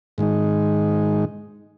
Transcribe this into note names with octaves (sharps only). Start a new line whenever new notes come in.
G#2 D#3 G#3 D#4